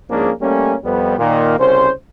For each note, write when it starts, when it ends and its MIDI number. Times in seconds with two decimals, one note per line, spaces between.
0.10 0.30 44
0.10 0.30 53
0.10 0.30 58
0.10 0.30 61
0.10 0.30 62
0.10 0.30 68
0.41 0.74 55
0.41 0.74 57
0.41 0.74 58
0.41 0.74 61
0.85 1.18 41
0.85 1.18 55
0.85 1.18 59
1.18 1.58 46
1.18 1.58 51
1.18 1.58 58
1.59 1.90 36
1.59 1.90 49
1.59 1.90 61
1.59 1.90 72